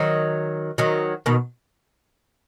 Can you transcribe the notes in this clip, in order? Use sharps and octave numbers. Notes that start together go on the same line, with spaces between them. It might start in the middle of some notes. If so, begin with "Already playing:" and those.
Already playing: D#3 F#3
D#3 F#3
B2 D#3